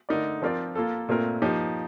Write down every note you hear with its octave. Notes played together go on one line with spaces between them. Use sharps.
D3 A3 D#4 A#4 D5
F3 C4 F4 A#4 D5
A#3 F4 A4
A#2 A3 C4 F4 A#4
F3 A#3 D#4 G4